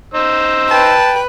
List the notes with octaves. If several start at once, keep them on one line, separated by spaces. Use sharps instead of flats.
D#4 C5 E6
B4 G5 A5